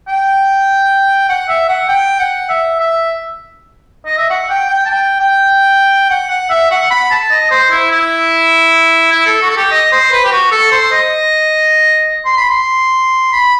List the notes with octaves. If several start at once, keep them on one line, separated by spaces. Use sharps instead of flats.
G5
F#5
E5
F#5
G5
F#5
E5
E5
D#5
E5
F#5
G5
G5
A5
G5
G5
F#5
F#5
E5
F#5
B5
A5
D#5
C5
E4
E4
E4
A4
F#4
A4
G4
D#5
C5
B4
G4
F#4
A4
C5
D#5
C6
B5
C6
B5